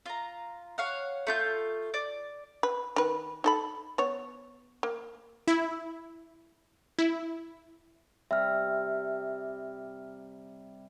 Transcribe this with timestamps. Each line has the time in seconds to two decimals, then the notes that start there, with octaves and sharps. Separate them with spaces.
0.06 F4 A#5
0.78 C#5 F5 F#5
1.27 A3 F4 G6
1.94 D5
2.63 B4
2.96 D#3 B4
3.44 D#4 A4 B5
3.98 B3 C#5
4.83 A#3
5.48 E4
6.99 E4
8.31 C3 G3 E5 F6